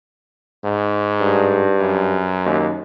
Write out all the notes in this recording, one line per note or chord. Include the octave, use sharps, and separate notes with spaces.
G#2
G2
F#2
D#2